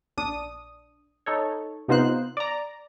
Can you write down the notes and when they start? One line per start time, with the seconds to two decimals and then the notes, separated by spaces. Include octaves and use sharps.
0.18 A#1 D4 D#6
1.26 D#4 A4 C#5
1.88 C3 B3 D#4 F4 C5 F#6
2.37 D5 A#5